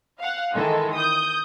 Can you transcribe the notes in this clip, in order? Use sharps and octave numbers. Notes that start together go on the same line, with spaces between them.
F5 F#5
D#3 E3 G#3 A4
D#6 G6